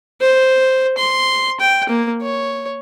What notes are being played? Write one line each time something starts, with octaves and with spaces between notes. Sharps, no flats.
C5
C6
G5
A#3
C#5